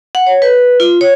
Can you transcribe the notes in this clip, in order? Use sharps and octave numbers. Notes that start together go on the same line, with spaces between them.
F#5
C#5
B4
F4
C#5